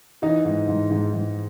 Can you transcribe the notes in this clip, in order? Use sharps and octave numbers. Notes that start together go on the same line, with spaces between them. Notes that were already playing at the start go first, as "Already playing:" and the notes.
E3 D#4
G#2
G#2
G#2
G#2